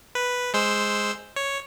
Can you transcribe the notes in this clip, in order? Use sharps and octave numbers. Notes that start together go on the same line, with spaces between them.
B4
G#3 C5 E6
C#5